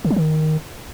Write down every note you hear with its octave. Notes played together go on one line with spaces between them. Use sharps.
D3
F#3
D#3